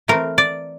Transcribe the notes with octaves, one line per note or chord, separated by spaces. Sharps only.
E3 A3 C4 A#4
D5